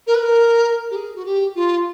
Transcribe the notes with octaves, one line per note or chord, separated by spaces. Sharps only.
A#4
B4
A#4
G4
G#4
F#4
G4
F4